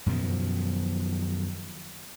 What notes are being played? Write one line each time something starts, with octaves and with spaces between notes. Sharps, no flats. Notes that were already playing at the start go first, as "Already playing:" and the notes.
F#2 B2 D#3 F3